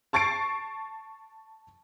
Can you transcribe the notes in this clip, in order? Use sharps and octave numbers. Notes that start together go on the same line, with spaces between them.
A5 C#6 A6 C7 D7